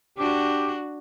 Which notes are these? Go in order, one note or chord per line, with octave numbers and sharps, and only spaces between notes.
D4 F#4 G4